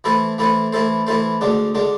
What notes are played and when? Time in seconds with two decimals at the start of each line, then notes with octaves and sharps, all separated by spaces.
0.04 E3 A3 E4 A4 C5
0.38 E3 A3 E4 A4 C5
0.72 E3 A3 E4 A4 C5
1.07 E3 A3 E4 A4 C5
1.41 D2 D3 G#3 D4
1.75 D3 G#3 D4